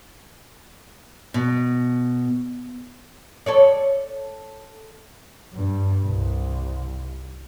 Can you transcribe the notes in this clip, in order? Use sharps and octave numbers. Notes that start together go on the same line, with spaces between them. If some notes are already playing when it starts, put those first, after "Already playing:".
B2
A4 C#5 D5
G2
C2